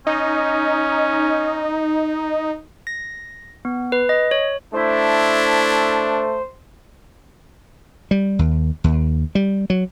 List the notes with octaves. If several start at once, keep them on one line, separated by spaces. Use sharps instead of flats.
C#4 D#4
A#6
B3
B4
D#5
C#5
A3 D4 E4 C5
G3
D#2
D#2
G3
F#3